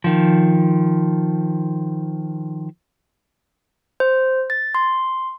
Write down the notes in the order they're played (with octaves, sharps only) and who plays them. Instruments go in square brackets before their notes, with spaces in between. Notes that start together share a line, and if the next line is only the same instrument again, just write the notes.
[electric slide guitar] D#3 F3
[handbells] C5
A6
C6